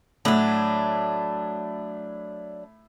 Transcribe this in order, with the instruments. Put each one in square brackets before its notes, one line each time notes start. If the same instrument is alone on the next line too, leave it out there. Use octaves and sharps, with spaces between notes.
[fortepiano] A2 [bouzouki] F#3 D4